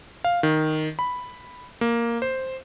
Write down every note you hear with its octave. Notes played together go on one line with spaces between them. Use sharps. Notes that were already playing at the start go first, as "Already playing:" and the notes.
F5
D#3
B5
A#3
C5